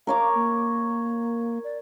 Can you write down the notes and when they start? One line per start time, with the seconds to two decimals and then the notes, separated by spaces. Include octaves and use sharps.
0.07 A#4 C#5 F5 D6
0.35 A#3
1.64 D5